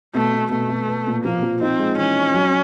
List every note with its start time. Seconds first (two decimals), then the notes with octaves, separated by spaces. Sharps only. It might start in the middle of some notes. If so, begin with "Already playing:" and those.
0.15 B2 A3
0.33 B2
0.51 B2 A3
0.69 B2
0.89 B3
1.07 A#2
1.24 F3 A#3
1.43 F3
1.61 C4 D#4
1.79 G#3
1.98 E3 C#4
2.16 C4
2.34 F#3